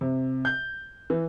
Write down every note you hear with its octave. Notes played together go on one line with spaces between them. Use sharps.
C3
G6
E3